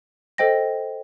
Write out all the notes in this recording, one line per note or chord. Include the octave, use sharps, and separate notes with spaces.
A4 C5 D#5 G5 A#6